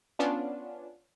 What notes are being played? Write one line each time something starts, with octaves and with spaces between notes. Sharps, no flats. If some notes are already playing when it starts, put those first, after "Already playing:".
B3 C#4 D4 F4